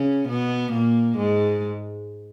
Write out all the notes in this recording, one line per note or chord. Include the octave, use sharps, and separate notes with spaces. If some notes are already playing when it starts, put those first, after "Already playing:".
Already playing: C#3 C#4
B2 B3
A#2 A#3
G#2 G#3